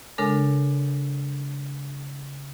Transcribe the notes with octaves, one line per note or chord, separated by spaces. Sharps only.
C#3 G#3 D4 A4 A#4